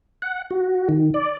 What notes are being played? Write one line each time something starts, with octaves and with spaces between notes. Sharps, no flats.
F#5
F#4
D#3
D5